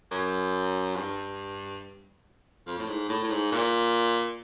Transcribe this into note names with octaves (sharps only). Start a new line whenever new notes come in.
F#2
G2
F2
A2
G#2
A2
A2
G#2
A#2